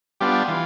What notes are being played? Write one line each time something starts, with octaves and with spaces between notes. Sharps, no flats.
G3 B3 D4 F4 G4
E3 F4